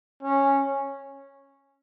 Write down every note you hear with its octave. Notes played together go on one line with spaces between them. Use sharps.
C#4